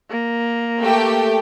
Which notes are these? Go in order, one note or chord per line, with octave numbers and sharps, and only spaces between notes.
A#3
A3 G4 G5